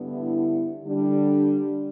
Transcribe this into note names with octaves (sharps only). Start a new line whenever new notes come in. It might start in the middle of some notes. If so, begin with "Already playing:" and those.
Already playing: G2 D3 B3 E4
D3 G3 D4